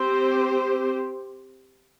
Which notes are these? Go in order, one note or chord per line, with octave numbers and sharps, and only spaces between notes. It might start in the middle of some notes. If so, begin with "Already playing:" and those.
Already playing: C4 G4 C5